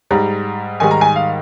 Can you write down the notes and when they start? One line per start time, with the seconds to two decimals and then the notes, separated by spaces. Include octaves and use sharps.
0.11 G#2 G3 A#5
0.80 G#2 D#3 G3 G#5
0.91 A#5
1.01 G#5
1.16 F5